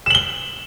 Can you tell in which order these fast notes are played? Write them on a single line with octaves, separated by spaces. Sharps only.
E7 F#7 G7